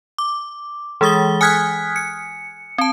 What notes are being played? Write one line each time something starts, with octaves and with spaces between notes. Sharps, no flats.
D6
E3 G#3 G#4 D#6 A6 G7
G#5 D#6 F6 F#6 G#6 B6
C#7
C4 A5